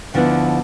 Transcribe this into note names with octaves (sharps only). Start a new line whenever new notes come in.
D2 D3 F3 B3 E4